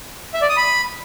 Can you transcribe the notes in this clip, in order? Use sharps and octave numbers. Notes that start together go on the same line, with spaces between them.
E5
D5
D#6
B5